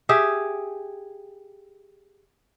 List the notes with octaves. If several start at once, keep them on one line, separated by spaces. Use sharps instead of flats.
G4 G#4 E5